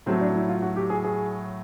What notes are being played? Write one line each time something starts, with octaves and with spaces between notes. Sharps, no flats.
A2 F#3 A3 C4
D4
E4
F4
F#4
G4
G#4
G#4